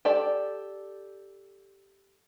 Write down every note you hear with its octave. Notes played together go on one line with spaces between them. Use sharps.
G4 A4 D5